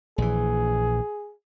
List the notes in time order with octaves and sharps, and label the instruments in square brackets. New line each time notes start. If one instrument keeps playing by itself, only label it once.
[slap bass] A#1 E3 [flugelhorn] G#4